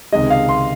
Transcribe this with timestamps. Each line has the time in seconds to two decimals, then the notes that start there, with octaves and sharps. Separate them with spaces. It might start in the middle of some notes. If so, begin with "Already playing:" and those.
0.13 C#2 C3 D#3 G#3 D#5
0.30 F5
0.49 C6